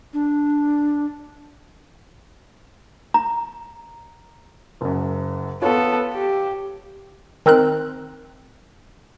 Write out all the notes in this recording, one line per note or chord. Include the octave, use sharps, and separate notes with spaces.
D4
A#5
F#1 F#2
B3 F4 A4 C#5
G4
D#3 C4 A#4 F#6